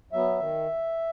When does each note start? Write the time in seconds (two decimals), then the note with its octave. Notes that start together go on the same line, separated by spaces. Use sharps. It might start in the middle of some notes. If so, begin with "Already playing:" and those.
0.12 F#3 B3 E5
0.40 D#3